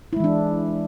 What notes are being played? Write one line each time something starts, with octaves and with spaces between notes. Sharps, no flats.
E3 G#3 D4 E4